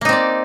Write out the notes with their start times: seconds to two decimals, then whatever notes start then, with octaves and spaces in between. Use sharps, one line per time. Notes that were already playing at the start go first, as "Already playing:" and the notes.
0.01 A#3
0.05 D#4
0.09 C4
0.13 D5